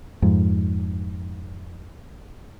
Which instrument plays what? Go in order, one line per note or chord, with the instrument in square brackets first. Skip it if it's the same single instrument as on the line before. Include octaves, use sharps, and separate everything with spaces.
[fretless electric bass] F2 G#2